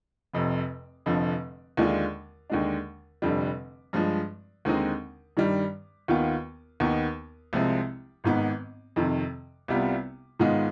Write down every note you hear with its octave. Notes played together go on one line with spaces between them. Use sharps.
F1 F2 C3
F1 F2 D3 F3
D#2 D3 G#3 D4 F4
D#2 D3 G#3 D4
F1 F2 D3 G3
G2 F3 G#3
D#2 D3 G#3 C4 D#4
G2 D#3 G3
D#2 D#3 B3 F4
D#2 D#3 B3 D#4
C2 C3 F3 G#3 C4
G#1 G#2 D#3 B3
F2 C3 D#3
C2 C3 G3 B3 F4
G#2 D#3 G#3 B3 F4